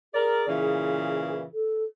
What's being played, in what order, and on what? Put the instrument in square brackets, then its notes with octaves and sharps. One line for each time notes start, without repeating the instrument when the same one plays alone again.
[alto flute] G#4 [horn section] A#4 D5
[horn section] A#2 C#3 E3
[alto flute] A4